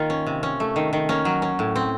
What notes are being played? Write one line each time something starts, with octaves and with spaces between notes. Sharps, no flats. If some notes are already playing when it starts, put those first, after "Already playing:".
Already playing: D#3 A#3 F4
C#4
C3
C#4
A3
D#3
D#3
A#3 C#4
F#3
C#4
A2
C4